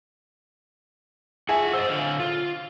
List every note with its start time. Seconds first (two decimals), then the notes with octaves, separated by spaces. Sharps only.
1.49 F4 G#4 E5 F#5 G#5
1.74 C5 D#5 E6
1.89 D3 F5
2.20 F4